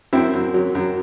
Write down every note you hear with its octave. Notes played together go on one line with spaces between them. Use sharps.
F#2 C4 E4
F#2
F#3
F#2